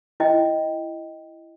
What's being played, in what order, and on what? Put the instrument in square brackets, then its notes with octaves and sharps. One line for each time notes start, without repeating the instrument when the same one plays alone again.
[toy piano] E4 D#5 G5